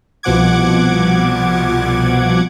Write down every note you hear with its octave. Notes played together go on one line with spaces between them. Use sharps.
C2 B2 F3 F#5 D6 G#6